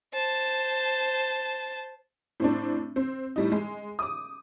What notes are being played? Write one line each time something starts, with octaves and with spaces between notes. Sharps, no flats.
C5 A5
A2 C4 D4
C4
A2 G3 D#4
G#3
D6 D#6